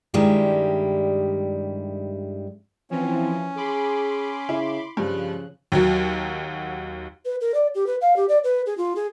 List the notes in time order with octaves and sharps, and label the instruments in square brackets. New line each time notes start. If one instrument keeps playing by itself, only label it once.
[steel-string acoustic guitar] G2 D#3 G3 G#3 E4 G4
[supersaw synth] E3 F3 [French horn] C4 [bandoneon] C#4
[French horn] G#4 [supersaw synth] B5 C6 D6
[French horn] C#3 [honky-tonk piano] E4
[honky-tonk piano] G2 [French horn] C#3 [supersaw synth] F3 F#6
[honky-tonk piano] D#2 F#3 F#4
[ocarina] B4
A#4
D5
G4
B4
F5
G4
D5
B4
G#4
F4
G#4